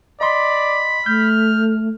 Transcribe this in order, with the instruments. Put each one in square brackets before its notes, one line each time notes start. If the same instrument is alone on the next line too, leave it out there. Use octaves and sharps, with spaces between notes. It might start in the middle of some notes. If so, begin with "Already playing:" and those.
[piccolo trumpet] D5 [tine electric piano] D#5 C6 [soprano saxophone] B5
[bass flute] A3 [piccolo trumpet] F6 [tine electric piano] G6